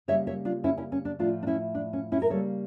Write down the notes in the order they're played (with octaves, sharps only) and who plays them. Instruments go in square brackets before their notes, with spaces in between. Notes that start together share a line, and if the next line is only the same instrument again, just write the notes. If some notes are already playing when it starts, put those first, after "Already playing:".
[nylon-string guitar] C#3 G3 A#3 C#5 E5
C#5 E5
D4 F4
C#4 E4
C#4 E4
C#4
D4
A2 F3 A3 D4 F4
D4
C#4 E4
D4
C#4
C#4 E4
A#4
C#3 G3 A#3 A4 C#5